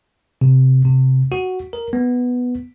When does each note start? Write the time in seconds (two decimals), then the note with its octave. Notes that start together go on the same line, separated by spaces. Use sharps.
0.41 C3
0.85 C3
1.32 F#4
1.73 A#4
1.93 B3